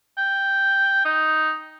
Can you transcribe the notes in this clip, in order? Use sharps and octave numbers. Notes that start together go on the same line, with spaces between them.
G5
D#4